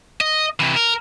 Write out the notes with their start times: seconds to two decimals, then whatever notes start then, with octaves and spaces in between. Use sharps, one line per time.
0.21 D#5
0.60 C3 E3
0.76 A#4